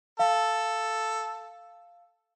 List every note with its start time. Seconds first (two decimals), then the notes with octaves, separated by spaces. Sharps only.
0.19 A4 F5